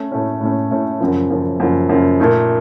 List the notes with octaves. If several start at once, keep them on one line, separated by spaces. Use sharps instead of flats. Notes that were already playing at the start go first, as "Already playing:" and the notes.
Already playing: A3 C#4
A2 A3 C#4
A2 A3 C#4
A2 A3 C#4
F#2 C#3 F3
F#2 C#3 F3
F#2 C#3 F3
F#2 C#3 F3
A#2 A3 D#4